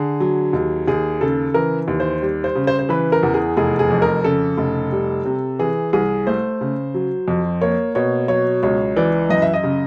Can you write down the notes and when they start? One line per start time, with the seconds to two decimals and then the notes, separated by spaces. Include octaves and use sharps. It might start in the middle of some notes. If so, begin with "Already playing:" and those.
Already playing: D3 G#4
0.20 F#3
0.53 D#2
0.88 D#2 G#4
1.21 C#3 A4
1.54 E3 A#4
1.88 D#2
2.00 C5
2.22 G3
2.44 C5
2.55 C#3
2.67 C5
2.79 C5
2.89 E3 B4
3.12 A#4
3.23 E2
3.34 G#4
3.57 F1 G#4
3.79 G#4
3.90 F2
4.02 A#4
4.24 C#3 A4
4.58 F1
4.92 G3
5.25 C3
5.59 E3 G#4
5.93 C2 G#4
6.26 A3 C5
6.61 C#3
6.94 F#3
7.28 F2
7.61 A#3 C#5
7.95 B2 C#5
8.28 F#3 C#5
8.63 C#2 C#5
8.96 E3 D5
9.29 F#2 D#5
9.42 E5
9.54 D#5
9.63 C#3